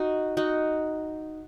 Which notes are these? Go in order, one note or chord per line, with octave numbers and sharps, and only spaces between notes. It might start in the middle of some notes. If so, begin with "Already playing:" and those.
Already playing: D#4 F#4
D#4 F#4